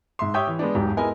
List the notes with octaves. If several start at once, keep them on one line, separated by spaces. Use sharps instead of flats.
G#2 E5 C6
G4 C#5 E5 G5 D#6 G6
E3
G#3 B3 D4
E1 B1 G#2 G4
G#3 B3 E4 A#4 D#5 G#5